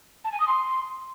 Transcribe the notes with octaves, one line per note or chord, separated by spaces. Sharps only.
A5
G#5
D#6
C6